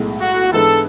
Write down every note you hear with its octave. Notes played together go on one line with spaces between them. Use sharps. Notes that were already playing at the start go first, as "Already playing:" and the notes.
Already playing: B1 A2 G#3
F#4
G#2 E3 G#3 B3 D4 A4